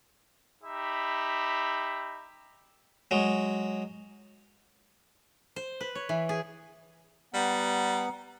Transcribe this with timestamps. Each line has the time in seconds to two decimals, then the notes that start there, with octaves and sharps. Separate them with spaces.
0.63 D#4 G4 E5 B5
3.11 F#3 G#3
5.56 C5
5.81 B4
5.95 C#5
6.09 E3
6.29 G#4
7.34 G3 B3 F#5 A#5